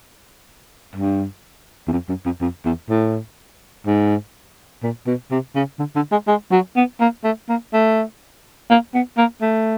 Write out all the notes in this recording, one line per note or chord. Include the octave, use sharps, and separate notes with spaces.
G2
E2
F2
F#2
F2
F2
E2
A2
G#2
A#2
B2
C3
C#3
D3
D3
G#3
G#3
F#3
B3
A#3
A3
A#3
A3
A#3
B3
A#3
A3